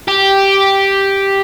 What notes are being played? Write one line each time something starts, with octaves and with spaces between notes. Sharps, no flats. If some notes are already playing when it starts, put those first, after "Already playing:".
G4